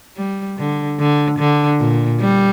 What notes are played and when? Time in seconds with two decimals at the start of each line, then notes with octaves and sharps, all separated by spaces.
0.17 G3
0.58 D3
0.99 D3
1.39 D3
1.80 A#2
2.20 G3